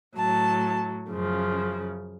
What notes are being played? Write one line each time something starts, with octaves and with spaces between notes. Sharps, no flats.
A2 F#3 A5
F#2 C#3 F3